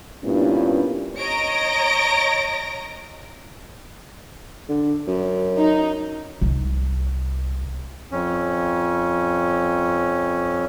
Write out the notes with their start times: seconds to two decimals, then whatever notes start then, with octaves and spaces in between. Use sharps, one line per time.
0.24 G2 A#2 B3 C#4 D4 E4
1.18 C#5 D#5 A#5 A#6 D7
4.69 D3
5.07 F#2
5.58 D#4
6.41 C2
8.12 F2 C#4